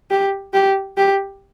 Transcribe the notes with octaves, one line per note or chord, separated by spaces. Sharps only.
G4
G4
G4